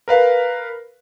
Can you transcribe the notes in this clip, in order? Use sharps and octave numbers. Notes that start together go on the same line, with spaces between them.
A#4 B4 F5